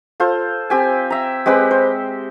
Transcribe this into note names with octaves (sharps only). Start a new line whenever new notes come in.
F4 A4 C5
C4 G4 G#5
E5 A#5
G#3 C4 G4 B4
C5